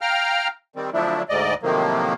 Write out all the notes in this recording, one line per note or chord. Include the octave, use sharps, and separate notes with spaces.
F5 G5 A#5 F6
D#3 G3 C4
D3 F3 F#3 A3 D4 E4
D2 G#2 D5 D#5
A2 C3 D#3 F3 F#3 A#3